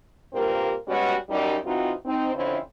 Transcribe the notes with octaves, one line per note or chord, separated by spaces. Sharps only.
G2 A#2 A#3 C4 G4 A#4
G3 G#3 B3 C#4 F#4
F#2 G3 D#4
E3 C4 D#4 F4 F#4
C4 D#4
F2 D3 C4 C#4 E4